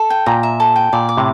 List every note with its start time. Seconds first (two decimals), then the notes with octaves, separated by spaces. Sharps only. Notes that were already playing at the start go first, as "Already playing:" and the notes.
Already playing: A4
0.10 G5
0.26 A#2 A#5
0.43 E5
0.60 A4
0.76 G5
0.93 A#2 D5
1.09 D6
1.17 A2 C3